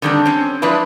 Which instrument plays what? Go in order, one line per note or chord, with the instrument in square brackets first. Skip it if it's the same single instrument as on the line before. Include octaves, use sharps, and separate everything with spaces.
[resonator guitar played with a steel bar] D3 D#3 G3 C4 D4
C4 C#4
F3 G#3 D4 E4 B4